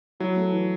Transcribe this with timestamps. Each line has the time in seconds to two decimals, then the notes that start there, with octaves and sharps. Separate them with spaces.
0.20 F#3 E4
0.36 A3
0.52 E3